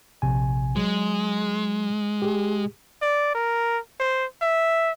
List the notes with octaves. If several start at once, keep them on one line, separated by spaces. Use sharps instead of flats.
A#1 C3 G#5
F#3 G#3
G4 G#4
D5
A#4
C5
E5